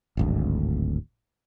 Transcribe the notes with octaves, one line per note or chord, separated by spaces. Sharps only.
D1 G#1 D2